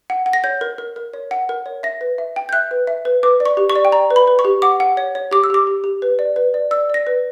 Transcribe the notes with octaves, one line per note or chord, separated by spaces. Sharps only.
F#5
F#5
A#6
C#5 G6
A#4
A#4
A#4
C#5
F#5
A#4
C#5
E5 A#6
B4
E5
G5
G6
E5 F#6
B4
E5
B4
B4 D6
D5
C#6
G4
C#6
D5
G5
D5 A#5
B4
B5
B4
C#6
G4
F#5 D6
F#5
C#5
C#5
G4 D6
E6
G4 D6
G4
G4
B4
D5
B4
D5
D5 E6
D5 A#6
B4